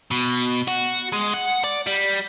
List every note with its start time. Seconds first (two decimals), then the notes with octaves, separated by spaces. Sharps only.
0.11 B2
0.68 F#4
1.13 G#3
1.34 F#5
1.64 D5
1.87 G3